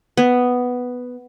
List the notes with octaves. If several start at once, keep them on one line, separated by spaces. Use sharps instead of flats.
B3